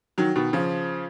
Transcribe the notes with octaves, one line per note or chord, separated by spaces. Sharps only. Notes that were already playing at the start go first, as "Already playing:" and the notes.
D#3 F#3
B2 D#3
C#3 F3